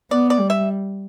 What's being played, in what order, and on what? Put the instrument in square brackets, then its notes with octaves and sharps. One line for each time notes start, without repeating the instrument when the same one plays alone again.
[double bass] B3 [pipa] D5
[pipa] D5
[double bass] G3
[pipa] E5